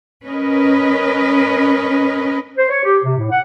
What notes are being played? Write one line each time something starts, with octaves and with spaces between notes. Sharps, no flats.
C#4 A#4 B4 D#5
C5
C#5
G4
C3
A2
F#5